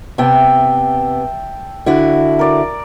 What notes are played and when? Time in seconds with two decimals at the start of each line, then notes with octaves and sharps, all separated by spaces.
0.18 C3 B3 E5 G5 A5
1.86 D3 E4 F#4
2.39 A#4 D5